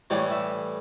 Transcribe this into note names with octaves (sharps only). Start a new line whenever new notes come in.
A2 E3 G3 C#5
E5